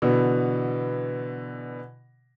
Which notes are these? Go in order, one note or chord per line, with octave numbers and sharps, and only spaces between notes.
B2 D3 E3 B3